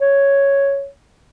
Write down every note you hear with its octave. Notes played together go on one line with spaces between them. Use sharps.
C#5